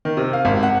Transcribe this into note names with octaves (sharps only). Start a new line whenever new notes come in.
D#3
C3
F5
G#1
F#5